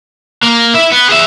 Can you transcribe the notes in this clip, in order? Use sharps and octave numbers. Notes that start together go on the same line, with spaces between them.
A#3
E4 E5
B3
G#4 E5